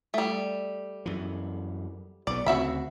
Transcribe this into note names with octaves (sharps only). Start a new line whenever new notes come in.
G3 A3
F#2 E3
B1 B3 D5
D2 C#3 C4 F#4 E5 B5